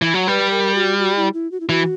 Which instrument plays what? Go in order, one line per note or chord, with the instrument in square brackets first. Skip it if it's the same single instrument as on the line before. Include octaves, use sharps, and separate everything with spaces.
[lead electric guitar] E3
F#3
[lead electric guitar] G3 [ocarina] B4
[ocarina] A#4
F#4
F#4
E4
E4
F#4
E4
[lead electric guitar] E3 [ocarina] F#4